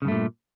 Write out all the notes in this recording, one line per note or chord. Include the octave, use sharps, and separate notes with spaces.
G2 A#2 C#3 A3